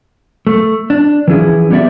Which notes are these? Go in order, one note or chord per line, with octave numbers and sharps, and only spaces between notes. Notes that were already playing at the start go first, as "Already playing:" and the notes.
A3
D4
E3 F3 C#4 E4 G#4
G3 B3 G#4 C#5 D5 E5